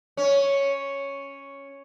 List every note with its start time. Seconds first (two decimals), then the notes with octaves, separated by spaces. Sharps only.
0.17 C#4